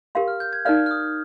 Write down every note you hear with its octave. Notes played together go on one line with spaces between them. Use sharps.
G4 A#4 F5 C6
F6
G6
G#6
D#4 A#4 D5 F5 F6
F6
D#6